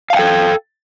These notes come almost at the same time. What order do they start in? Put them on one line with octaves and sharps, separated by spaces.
F5 A5 G5 A4